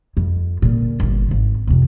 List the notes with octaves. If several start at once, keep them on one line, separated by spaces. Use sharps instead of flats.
F2
A#2 D3
G1 D3
G#1
F2 C3